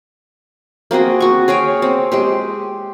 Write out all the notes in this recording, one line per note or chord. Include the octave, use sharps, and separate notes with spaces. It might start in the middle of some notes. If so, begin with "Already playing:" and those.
A#3 C4 F#4 G#4
F#4 C#6
G#4 C#5 F5 G5
C4
G#3 G4 C5